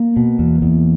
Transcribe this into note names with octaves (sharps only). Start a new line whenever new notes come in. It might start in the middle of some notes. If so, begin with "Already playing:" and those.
Already playing: A#3
B2
E2
E2